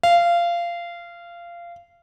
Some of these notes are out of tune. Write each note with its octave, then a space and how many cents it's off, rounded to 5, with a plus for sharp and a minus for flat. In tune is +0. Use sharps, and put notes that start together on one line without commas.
F5 -20